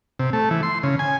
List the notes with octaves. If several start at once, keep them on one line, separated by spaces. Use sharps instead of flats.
C3
A3
E3
C6
C#3
G#5